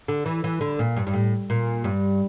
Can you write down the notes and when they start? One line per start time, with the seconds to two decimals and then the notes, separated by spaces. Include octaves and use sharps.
0.08 D3
0.26 E3
0.44 E3
0.61 D3
0.79 A#2
0.97 G2
1.07 G2
1.14 A2
1.50 A#2
1.84 G2